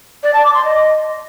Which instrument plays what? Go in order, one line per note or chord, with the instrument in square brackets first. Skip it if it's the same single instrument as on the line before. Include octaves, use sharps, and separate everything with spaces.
[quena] D5
A5
D6
C6
D#5